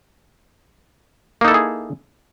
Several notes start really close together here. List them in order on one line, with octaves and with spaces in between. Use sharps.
A#3 D#4 A4 E4 G#4